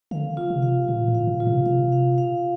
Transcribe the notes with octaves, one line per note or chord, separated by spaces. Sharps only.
D3 F5
F4
C3
F5
A#2 F4
A2
F5
A#2
F4
C3
C3 F5
F5
F5